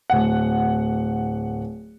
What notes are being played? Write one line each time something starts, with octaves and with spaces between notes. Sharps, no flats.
D1 F#5